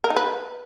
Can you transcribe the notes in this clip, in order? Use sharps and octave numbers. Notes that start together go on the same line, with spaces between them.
A#4
D#4
B4